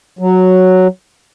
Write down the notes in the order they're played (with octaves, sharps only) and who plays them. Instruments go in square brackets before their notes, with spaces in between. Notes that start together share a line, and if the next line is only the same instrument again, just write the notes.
[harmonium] F#3